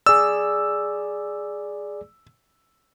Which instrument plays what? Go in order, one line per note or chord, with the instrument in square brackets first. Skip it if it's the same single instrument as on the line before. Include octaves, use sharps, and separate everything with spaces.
[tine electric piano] G#4 D5 [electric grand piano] E6